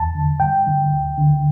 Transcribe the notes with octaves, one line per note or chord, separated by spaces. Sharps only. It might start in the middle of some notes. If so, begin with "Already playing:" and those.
Already playing: E2 A5
D3
G2 G5
D3
D2
D3